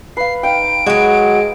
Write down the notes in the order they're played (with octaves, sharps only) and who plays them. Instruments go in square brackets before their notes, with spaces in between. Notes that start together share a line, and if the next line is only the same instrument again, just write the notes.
[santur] B4 F5 [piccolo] C7
[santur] D#4 F5 G5 [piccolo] D7
[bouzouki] F#3 F#4 [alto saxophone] G#3